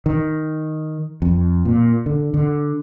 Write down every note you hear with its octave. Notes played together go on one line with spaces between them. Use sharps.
D#3
F2
A#2
D3
D3